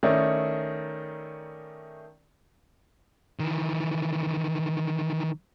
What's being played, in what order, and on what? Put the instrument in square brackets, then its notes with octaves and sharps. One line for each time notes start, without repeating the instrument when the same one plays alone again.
[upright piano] D#3 A3 C#4 D#4 E4 D5
[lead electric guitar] D#3 E3